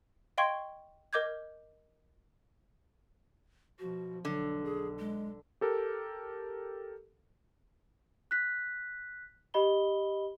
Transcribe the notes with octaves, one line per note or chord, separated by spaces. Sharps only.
D#5 F5 G5 C6 C#6 G#6
A#4 D#5 D6 G6 G#6
B2 F3 F#4
B1 D3 F#3
G#4
G#3
G4 A4 A#4
F#6 B6
G4 D#5 B5 G7